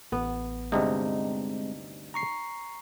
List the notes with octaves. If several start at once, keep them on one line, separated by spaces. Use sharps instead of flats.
A1 B3
D2 G2 C3 G#3 C4 D#4
A#5 C#6 C7